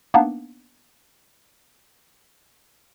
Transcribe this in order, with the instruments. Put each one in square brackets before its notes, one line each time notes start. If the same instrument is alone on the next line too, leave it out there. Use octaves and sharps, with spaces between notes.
[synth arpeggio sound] A#3 B3 D4 D#4